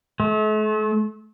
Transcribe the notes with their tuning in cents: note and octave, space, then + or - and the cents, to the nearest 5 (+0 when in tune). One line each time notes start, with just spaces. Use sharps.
A3 -40